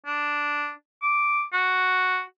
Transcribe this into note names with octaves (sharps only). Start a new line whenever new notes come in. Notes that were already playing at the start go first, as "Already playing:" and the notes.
D4
D6
F#4